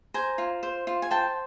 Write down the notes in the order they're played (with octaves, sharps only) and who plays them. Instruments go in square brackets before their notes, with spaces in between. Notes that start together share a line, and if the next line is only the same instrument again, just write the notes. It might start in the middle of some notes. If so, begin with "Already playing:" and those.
[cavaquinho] C5 G#5 A#5
F4
C5
F4
G#5
C5 G5 A5